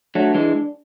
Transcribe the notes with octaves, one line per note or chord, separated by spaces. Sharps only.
F#3 A3 D4
E3 G#3